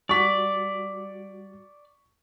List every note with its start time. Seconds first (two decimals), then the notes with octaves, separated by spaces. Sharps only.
0.09 G3 F#4 D5 C#6 B6